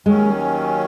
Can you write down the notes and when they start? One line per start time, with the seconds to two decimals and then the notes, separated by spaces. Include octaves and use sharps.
0.06 D#2 D#3 F#3 G#3 C#4